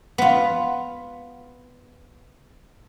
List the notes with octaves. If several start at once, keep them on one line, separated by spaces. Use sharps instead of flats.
B3 F4